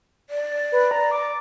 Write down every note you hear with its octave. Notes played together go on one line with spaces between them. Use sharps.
D5
B4
A#5
D6